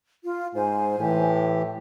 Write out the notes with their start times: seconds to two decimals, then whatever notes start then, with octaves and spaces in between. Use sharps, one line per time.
0.24 F4
0.55 G#2 C5 G#5
0.99 A2 E3 G4